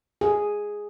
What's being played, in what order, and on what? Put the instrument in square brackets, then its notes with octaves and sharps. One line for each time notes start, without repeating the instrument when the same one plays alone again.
[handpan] G#4